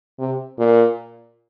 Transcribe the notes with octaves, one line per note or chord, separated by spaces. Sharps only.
C3
A#2